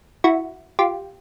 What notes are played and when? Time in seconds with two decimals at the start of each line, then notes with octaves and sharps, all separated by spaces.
0.24 E4 F#4
0.79 F4 G4